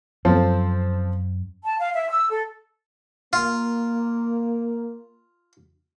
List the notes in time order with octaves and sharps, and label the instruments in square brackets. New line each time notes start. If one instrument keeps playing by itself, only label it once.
[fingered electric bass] F#2 [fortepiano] F3 C4 A4
[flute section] A5
F5
E5
E6
A4
[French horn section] A#3 [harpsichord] F4